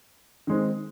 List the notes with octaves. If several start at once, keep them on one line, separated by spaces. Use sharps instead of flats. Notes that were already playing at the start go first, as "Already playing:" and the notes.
D#3 G#3 C4